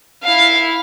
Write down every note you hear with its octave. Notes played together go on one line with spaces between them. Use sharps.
E4 F5